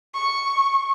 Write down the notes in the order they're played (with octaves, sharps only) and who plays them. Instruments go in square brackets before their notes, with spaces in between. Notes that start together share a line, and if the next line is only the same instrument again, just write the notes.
[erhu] C#6